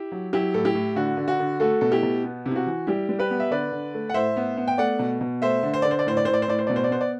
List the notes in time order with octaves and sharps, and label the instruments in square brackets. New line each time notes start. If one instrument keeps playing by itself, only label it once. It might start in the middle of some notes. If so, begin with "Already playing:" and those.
Already playing: [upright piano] E4 G4
F#3
F#3 E4 G4
A2 A4
E4 G4
A2
D3 F#4
D3
F#4
D3
A3 F#4 A4
B2 A4
E4 G4
B2
B3
C3
E4
F#4
E3
G3 E4 G4
G3
G4 B4
B3
E5
D3 B4 D5
D3
A3
F#5
A2 C5 E5
B3
B3
G5
A3 D5 F#5
B2
B2
A3 C5 E5
D3
C5
D3 D5
C5
D5
A2 C5
D5
A2 C5
D5
C5
A2 D5
C5
B2 D5
C5
D5
B3 C5
D5